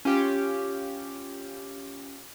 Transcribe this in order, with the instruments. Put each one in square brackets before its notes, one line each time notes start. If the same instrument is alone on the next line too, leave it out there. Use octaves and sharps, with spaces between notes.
[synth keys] C#4 F4 G4